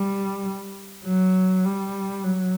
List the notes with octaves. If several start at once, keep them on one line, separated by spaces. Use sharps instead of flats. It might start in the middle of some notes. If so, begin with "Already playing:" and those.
Already playing: G3
F#3
G3
F#3